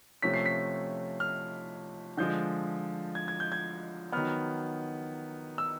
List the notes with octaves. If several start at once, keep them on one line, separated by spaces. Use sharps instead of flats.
C3 F3 A3 C#4 B6
C7
B6
F6
D3 F3 G#3 G6
G#6
G#6
G6
G#6
D#3 F#3 B3 F6
E6